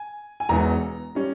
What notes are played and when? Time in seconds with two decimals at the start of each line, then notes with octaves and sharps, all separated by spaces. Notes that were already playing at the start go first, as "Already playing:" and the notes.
Already playing: G#5
0.40 G#5
0.49 E1 E2 E3 A#5
1.15 G3 C#4